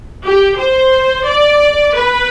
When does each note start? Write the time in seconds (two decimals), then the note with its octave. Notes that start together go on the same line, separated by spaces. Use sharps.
0.24 G4
0.58 C5
1.26 D5
1.94 B4